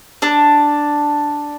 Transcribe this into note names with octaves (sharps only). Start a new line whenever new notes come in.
D4